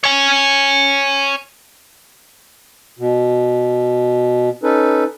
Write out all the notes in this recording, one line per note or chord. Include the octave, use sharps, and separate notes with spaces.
C#5 G#5
B2
C#4 D#4 A4 B4